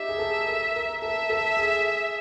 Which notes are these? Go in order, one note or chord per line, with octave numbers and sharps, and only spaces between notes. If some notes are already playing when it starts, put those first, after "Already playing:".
Already playing: D#4 G4 E5
G#4
A4
A#4
A#4
A4 E5
A4
G#4